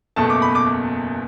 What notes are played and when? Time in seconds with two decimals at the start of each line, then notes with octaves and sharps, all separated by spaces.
0.16 F#1 E2 B2 A3 A5
0.30 D6
0.42 B5
0.55 D6